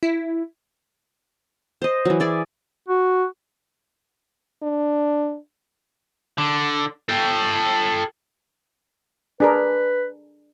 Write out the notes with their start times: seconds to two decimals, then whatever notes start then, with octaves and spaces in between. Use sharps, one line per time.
0.03 E4
1.82 C5 D#5
2.05 E3 F#3
2.20 G#4 D5 E5
2.88 F#4
4.63 D4
6.38 D3
7.09 A4 G5
9.40 D4 G#4 A#4 B4